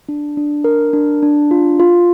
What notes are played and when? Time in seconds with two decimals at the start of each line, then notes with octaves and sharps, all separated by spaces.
0.09 D4
0.37 D4
0.64 A#4
0.93 D4
1.22 D4
1.51 F4
1.80 F4